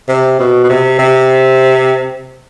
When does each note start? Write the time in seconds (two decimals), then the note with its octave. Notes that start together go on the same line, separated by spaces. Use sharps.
0.09 C3
0.39 B2
0.64 B2
0.69 C3
0.99 C3